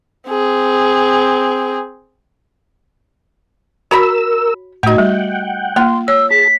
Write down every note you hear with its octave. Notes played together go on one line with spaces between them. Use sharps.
C4 G#4
F#4 A#4 C#5 A#5 B5 E6
A2 A3 D#4 F#4 G4 G#6
G3 F#5 G5
A#3 F4 C6
C#5 E6
G#4 A5 B6